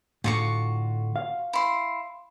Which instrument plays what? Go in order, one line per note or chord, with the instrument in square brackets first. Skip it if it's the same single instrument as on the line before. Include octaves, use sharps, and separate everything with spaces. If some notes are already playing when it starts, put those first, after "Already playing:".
[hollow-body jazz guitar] A2 D3 [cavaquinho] F4 F#4 C#6
[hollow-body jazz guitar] F5
[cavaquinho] E4 C6